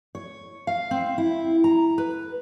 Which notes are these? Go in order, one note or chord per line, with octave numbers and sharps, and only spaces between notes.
C#5
F5
C4
E4
A#5
B4